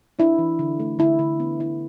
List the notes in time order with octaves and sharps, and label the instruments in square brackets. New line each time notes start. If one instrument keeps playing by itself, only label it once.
[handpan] D4 E4
E3
D3
A3
D3 E4
D3
B3
E4